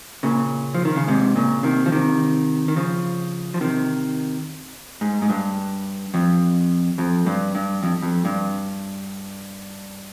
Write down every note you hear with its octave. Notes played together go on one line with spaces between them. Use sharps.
A#2 C#3
F3
D#3
C#3
G#2 C3
A#2 C#3
C3 D#3
F3
C3 D#3
D#3
C#3 F3
F3
C3 D#3
G#2
G#2
G2
F2
F2
G2
G2
F2
F2
G2